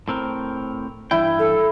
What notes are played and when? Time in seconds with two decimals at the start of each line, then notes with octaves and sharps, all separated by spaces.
0.08 A2 C4 A#4
1.11 G2 E3 E4 G5
1.39 A4